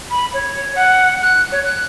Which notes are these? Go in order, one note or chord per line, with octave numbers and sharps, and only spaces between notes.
B5
C#5
F#5
F#6
C#5
F#6